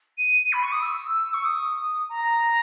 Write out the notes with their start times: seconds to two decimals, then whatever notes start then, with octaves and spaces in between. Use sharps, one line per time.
0.18 D#7
0.53 B5
0.63 C#6
0.72 D#6
0.82 E6
1.33 C#6
1.45 D#6
2.09 A#5